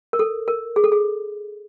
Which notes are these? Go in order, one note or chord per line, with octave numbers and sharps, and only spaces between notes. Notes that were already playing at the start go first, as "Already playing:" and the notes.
A#4
A4
A#4
G#4
A4
G#4